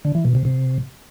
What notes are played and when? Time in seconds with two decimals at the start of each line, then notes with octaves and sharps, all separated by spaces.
0.05 D3
0.15 E3
0.25 B2
0.35 C3
0.45 C3